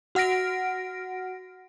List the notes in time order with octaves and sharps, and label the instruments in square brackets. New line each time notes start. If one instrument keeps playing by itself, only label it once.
[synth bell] F#4 F#5 F6 A#6 D7